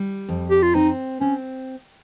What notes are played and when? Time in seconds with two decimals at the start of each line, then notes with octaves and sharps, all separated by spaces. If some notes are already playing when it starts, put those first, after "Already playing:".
Already playing: G3
0.29 F2
0.50 G4
0.62 F4
0.75 C4 D#4
1.20 C4 C#4